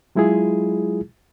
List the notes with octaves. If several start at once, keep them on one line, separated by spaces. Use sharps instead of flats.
F#3 G#3 E4 F4 G#4